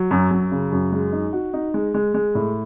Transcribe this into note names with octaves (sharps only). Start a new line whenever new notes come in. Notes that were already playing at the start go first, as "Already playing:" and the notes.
Already playing: F#3
F#2
F#2
C#3
F#2
G#3
D#4
F#4
D#4
G#3
G#3
G#3
A2